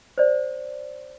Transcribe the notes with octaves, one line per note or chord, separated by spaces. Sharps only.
C5 D5